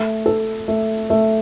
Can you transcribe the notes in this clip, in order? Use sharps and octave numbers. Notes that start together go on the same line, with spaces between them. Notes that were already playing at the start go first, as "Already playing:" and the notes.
Already playing: A3
A4
A3
A3